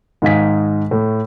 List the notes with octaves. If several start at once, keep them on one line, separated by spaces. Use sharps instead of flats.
G#2 D#3 D#4 F5 G#5 B6
A2 A3